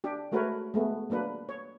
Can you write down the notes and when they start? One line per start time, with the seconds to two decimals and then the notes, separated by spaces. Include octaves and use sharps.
0.04 D4 G4
0.32 G#3 A3 F#4 A#4 B4 C#5
0.74 G#3 A3 B3
1.10 F#3 A#3 D4 B4
1.49 C#5